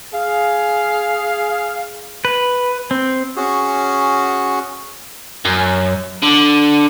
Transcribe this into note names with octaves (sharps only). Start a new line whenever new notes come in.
G#4 F5
B4
C4
C#4 F#4 G#4
F#2
D3